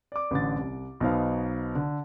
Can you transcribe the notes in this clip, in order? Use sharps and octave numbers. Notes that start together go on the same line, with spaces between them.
D5 D6
A1 D3 A6
C2
B1 B3 D#4 C5 F5
D3